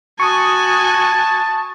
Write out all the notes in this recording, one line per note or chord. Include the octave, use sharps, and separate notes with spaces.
F#4 G#5 A5 C#6 D#6